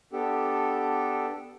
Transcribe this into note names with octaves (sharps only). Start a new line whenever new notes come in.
B3 D4 G4 A4